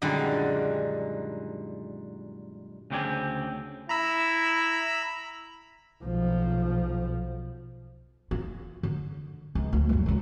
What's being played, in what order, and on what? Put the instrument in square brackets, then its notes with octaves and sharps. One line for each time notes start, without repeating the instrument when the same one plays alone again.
[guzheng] F#2 A#2 D3 D#3 G3 G#3
[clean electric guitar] D2 C#3 C4 G4 D5 G#5
[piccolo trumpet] E4 [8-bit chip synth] A#5 B5 E6
[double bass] B1 F3
[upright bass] F4
D3
C#2
D2 A3
F#2 G3
C#2 C#3